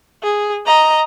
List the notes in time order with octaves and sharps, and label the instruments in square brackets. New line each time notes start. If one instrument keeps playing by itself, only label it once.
[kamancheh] G#4
D#5 A#5